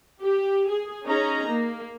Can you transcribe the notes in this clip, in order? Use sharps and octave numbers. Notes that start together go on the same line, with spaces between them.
G4
G#4
C#4 D#4 G#4 A#5
A#3